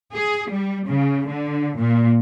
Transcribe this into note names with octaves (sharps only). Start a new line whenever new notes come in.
G#4
G3
C#3
D3
A#2